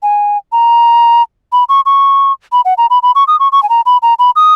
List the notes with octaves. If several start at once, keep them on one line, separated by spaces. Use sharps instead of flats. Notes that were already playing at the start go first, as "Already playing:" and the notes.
G#5
A#5
B5
C#6
C#6
B5
F#5
A#5
B5
B5
C#6
D#6
C#6
C#6
G#5
A#5
B5
A#5
B5
D#6